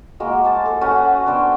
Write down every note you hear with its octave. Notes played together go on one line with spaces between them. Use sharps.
G#3 A#3 F#4
C5 A5
A4
C#4 F#4 B4 F#5
B3 D4 C5 G5